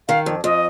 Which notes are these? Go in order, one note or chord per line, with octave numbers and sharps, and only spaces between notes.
D#3 F5
F2
F2 D#5